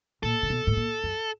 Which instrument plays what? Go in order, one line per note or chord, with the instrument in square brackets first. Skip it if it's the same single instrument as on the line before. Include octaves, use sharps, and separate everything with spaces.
[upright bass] A#2 [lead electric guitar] A4
[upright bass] C3
B2
A2
A#2
F#2